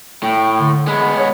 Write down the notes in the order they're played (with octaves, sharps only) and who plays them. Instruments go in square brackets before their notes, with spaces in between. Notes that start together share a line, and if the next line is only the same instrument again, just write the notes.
[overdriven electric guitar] A2 [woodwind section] A3 G5
[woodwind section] D3
[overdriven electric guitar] G#3 B3 [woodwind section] C#5 B5
[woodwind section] C#5